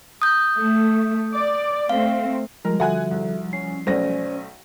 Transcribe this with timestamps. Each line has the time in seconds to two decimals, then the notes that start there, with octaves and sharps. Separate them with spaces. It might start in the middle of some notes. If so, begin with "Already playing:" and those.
0.22 D#6 G6
0.57 A3
1.33 D5
1.89 A3 C4 F5
2.65 F3 G3 G#3 A#4
2.80 D3 F#4 A4 E5 F#5 G#5 F#6
3.11 C2
3.53 C#4 C7
3.87 B1 A3 C#4 C5 D5 A#6